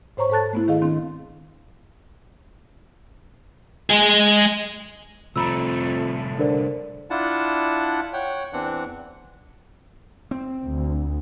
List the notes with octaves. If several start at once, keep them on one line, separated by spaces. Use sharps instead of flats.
G#2 C5 C#5 A#5 C#6
G#2 A4 A5 F#6 A6
A3 B3 E4
D#3 G#4 D#5 F5
D#3 C4 D4 C6
G#3 G#4
C2 F2 A3 A#5 B5 E6
D3 A#4 C5 D5
D4 E4 F4 F#5 A5
C#5 F#5 G5
E2 E3 C4 D4 F#5
C4
D2